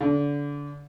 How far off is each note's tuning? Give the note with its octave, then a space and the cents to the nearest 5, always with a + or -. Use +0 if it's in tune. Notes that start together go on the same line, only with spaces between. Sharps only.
D3 -25